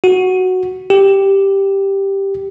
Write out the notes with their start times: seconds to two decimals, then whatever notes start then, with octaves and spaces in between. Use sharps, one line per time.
0.04 F#4
0.90 G4